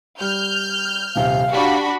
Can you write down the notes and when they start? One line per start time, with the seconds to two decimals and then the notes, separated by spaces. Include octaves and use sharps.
0.21 G3 F6 G6
1.16 D#1 C3 F5
1.53 D4 F#4 G4 B5